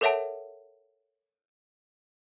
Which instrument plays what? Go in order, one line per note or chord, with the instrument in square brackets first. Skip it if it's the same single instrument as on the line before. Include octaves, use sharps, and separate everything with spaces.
[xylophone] A4 A#4 C#5 E5 F#5 A5